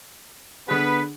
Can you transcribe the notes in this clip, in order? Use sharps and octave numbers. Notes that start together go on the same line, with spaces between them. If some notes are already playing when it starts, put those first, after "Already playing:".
D3 B3 D4 G#4 B4